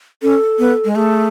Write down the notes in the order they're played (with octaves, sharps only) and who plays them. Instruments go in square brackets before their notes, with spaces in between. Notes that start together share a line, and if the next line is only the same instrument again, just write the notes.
[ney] C#4 [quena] A4
[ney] B3
G#3
[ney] A3 [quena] G#4